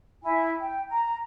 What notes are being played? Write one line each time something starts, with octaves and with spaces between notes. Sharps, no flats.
E4 G#5
G5
A#5